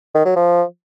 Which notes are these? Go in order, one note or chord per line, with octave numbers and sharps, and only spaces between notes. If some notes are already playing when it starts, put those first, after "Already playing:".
D#3
F#3
F3